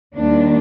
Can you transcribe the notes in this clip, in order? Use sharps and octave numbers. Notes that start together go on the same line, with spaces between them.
D#2 D#3 G3 A#3 D4